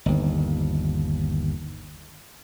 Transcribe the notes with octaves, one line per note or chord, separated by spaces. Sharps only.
G1 D#2